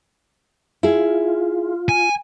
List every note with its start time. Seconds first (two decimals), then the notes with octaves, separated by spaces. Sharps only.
0.83 E4 F4 G#4
1.89 G#5